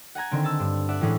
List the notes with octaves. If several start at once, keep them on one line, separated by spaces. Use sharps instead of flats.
F#5 G#5 A#5 G#6
D3 D#3 C4
A5 E6
G2
D5 E5 F#5
A2 E3 G#3 C#4 D4